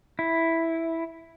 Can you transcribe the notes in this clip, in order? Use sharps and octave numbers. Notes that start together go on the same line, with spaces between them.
E4